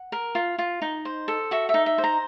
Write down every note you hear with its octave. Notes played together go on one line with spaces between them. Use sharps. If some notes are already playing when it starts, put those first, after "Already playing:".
Already playing: F#5
A#4
F4
F4
D#4
C5
A4
F#4 E5
E5
D#4
E5
C5
A#5